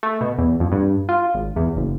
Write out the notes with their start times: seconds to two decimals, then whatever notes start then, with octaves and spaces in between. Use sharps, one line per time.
0.03 A3
0.21 B2
0.38 E2
0.60 F2
0.72 G2
1.09 F4
1.35 G#1
1.56 E2
1.76 F#1